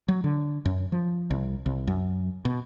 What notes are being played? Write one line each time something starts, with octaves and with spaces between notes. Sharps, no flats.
F#3
D3
F#2
F3
C2
C2
F#2
B2